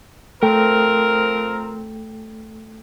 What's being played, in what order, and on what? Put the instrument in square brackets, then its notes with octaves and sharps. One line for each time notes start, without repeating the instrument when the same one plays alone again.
[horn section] F3 C4 A#4 [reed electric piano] A3 A4 G5